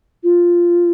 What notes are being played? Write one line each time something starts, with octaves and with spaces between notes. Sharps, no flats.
F4